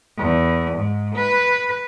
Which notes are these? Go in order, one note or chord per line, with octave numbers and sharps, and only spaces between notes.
E2
G#2
B4